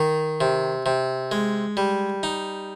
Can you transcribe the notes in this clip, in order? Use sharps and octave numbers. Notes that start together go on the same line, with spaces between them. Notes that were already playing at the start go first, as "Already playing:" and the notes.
Already playing: D#3
C3
C3
G#3
G3
D#4